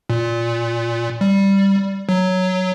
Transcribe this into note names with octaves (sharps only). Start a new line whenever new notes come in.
A#2
G3
F#3